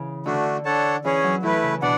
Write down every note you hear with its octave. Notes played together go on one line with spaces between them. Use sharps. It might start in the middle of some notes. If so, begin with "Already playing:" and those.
Already playing: C#3 E3
D3 A3 D4 F#4
D4 A4 C#5 F#5 A5
E3 C#4 G#4 C#5
F#3
E3 A3 E4 B4
C#3
B2 D4 D5 F#5